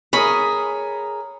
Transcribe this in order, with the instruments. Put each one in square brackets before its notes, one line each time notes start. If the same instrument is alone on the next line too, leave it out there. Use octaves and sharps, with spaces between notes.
[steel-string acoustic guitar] G#4 A#4 [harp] C#5 D#6 [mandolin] B5